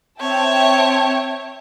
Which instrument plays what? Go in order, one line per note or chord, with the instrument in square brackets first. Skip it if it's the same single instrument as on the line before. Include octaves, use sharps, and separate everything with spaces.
[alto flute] C4 [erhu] C#5 [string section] E5 G5 A5